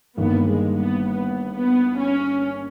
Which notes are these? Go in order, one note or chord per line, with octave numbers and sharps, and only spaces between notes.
G1 G2 D#3 A#3 B3
G#3
B3
B3
B3
C#4